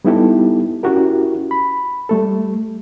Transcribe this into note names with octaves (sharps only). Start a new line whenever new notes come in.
G3 B3 D#4 E4 G4 A4
C#4 E4 F#4 G4 A#4
B5
G3 A3 A4